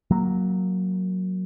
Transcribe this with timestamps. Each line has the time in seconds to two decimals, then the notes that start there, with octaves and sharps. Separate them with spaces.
0.11 F#3 A#3